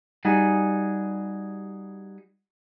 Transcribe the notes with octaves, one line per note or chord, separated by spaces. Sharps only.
G3 D#4 F#4 G#4 G#5